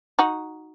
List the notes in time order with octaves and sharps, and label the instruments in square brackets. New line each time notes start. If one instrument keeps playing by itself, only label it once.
[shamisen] D#4 F#4